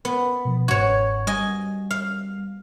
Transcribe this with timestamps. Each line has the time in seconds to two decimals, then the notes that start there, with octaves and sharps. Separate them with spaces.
0.05 B3
0.45 B2 F3
0.68 G1 G#2 F#4 C#5 G#6
1.27 G3 D#5 G#5
1.91 F5